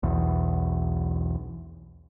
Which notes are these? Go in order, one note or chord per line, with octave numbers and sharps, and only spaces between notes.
B1 E2